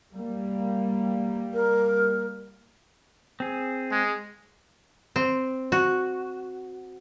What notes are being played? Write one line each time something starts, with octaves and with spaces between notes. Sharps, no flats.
G3 A#3
A#4
C4 G#4
G#3
C4
F#4